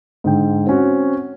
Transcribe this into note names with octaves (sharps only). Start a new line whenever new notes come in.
G#2 D3 G5
C4 C#4 F#4